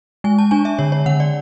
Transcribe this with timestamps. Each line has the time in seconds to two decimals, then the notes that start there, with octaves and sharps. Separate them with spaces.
0.24 G#3 G#5
0.38 A5
0.51 D4 G#5
0.65 E5
0.79 D3 C#5
0.92 C#5
1.06 D3 F#5
1.20 D5